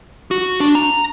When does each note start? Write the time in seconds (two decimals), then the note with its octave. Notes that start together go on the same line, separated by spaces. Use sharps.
0.31 F#4
0.60 D4
0.75 A#5